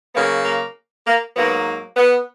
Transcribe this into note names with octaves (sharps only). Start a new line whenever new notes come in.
C#3 F#3 A#3 B3
A#3
A#3
G#2 F#3 A#3 B3
B3